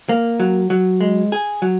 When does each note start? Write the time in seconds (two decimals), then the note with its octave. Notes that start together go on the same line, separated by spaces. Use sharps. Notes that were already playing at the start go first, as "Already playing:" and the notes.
0.09 A#3
0.40 F#3
0.70 F#3
1.01 G#3
1.32 G#4
1.62 F#3